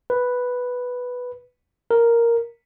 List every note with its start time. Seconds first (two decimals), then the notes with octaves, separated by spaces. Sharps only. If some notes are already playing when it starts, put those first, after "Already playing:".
0.10 B4
1.91 A#4